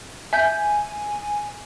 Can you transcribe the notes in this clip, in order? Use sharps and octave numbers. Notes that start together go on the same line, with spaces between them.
E5 G#5 G6